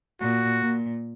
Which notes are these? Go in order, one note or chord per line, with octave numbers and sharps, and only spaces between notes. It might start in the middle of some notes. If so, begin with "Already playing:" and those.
A#2 F#4
A#2